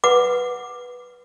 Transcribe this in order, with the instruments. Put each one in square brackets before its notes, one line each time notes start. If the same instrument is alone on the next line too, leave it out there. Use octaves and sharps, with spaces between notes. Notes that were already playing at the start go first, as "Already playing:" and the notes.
[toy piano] B4 F#5 D6